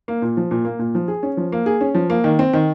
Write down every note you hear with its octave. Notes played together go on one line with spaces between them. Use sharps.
A#3
A#2
F3
A#2
A#3
A#2
F3
G#4
C#4
F3
A#3
G#4
C#4
F3
A#3
D#3
C4
D#3